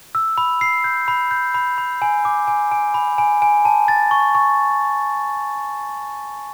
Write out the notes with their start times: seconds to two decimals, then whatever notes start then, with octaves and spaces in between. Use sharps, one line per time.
0.15 E6
0.38 B5
0.61 C7
0.84 G6
1.08 B5
1.31 G6
1.54 B5
1.78 B5
2.02 G#5
2.25 D6
2.48 G#5
2.71 G#5
2.94 B5
3.18 G#5
3.42 G#5
3.65 A5
3.88 A6
4.11 C#6
4.35 C#6